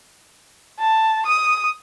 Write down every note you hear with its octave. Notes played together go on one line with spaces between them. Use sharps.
A5
D#6